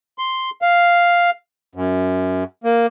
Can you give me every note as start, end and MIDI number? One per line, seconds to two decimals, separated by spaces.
0.18 0.50 84
0.62 1.30 77
1.75 2.44 42
2.64 2.86 58